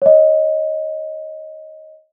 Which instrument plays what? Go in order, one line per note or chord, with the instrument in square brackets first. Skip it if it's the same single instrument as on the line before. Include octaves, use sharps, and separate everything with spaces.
[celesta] C#5 D#5